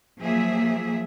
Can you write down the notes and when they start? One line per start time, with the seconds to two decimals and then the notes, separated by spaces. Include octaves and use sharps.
0.19 F3 F#3 A#3 G#4 E5